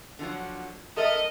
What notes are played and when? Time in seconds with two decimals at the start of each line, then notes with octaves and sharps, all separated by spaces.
0.19 D3 F3 F#3
0.97 A4 A#4 D#5 E5